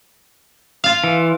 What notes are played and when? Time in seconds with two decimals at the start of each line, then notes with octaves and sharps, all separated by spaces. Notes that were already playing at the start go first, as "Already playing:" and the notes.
0.84 F4 F5
1.04 E3